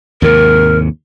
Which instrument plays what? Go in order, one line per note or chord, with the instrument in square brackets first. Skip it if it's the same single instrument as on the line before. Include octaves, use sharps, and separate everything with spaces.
[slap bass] D#2 G#2 C3 [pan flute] A#4